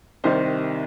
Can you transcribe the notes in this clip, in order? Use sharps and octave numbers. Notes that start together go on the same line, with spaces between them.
C2 C3 D#3 C5